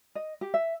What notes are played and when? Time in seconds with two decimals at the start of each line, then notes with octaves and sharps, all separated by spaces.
0.15 D#5
0.41 G4
0.54 E5